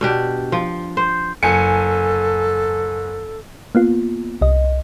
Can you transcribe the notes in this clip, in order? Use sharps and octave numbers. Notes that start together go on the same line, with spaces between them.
B2 D4 G4
F3
C5
F#1 A4 G#5 C#7
A#3 B3 F4
C2 D#5